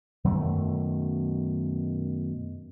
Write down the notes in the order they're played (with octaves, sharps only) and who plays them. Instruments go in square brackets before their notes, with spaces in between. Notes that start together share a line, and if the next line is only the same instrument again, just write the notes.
[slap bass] F#2 B2 D#3 A3